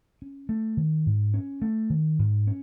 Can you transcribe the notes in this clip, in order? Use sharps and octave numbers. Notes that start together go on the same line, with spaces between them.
C#4
A3
D#3
G#2
C#4
A3
D#3
G#2
C#4